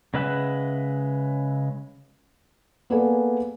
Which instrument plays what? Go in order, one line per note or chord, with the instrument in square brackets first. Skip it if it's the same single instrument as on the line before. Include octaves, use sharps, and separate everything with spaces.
[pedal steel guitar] C#3 G#3 B4 E5 F#5
[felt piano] A#3 B3 G#4 A4 D5 G#5